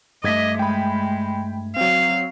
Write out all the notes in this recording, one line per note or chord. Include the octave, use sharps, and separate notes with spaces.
G2 A3 D#5 D6 G#6 B6
G#3 G5 B5
F#3 C4 F5